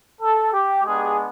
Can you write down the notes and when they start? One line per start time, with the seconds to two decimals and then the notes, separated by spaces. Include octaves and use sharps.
0.21 A4
0.53 G4
0.84 G#3 B3 D4 G4 G#4